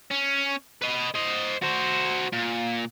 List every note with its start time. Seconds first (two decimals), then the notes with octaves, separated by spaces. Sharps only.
0.11 C#4
0.82 B4 D#5
1.15 C5 D#5
1.62 F#4 C5
2.33 A#2